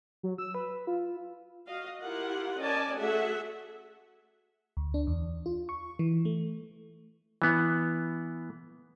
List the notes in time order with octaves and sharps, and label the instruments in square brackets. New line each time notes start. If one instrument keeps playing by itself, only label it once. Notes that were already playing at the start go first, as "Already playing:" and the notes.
[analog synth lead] F#3
E6
B4
F4
[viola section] F#4 D#5 F5
E4 F4 G4 A#4 F#5
C#4 A#4 D5 D#5 G#5 A5
A3 F#4 G#4 A4 E5 F#5
[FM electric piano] D2
D4
E2
F4
C#6
E3
A3
[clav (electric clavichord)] E3 B3